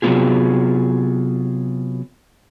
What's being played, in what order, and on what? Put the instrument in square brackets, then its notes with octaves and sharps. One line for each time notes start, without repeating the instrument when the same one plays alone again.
[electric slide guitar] C3 F#3 G3 B3 F4 G#4